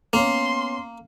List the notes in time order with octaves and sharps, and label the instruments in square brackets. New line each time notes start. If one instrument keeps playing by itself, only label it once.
[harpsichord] A#3 [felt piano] B3 C#4 C#5 [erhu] C6